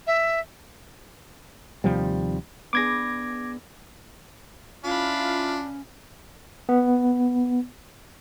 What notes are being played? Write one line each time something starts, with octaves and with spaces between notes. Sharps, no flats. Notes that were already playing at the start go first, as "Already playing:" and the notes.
E5
D#2 C3 F3 G3
B3 D4 G#4 D6 G#6 A#6
C#4 D4 E4 F4 F5 B5
B3